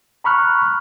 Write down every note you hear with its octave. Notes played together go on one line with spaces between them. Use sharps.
A#5 B5 C#6 F6 F#6